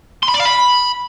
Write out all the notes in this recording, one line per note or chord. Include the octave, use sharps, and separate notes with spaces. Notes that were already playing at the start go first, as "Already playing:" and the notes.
C6
B5
D5
F5
B5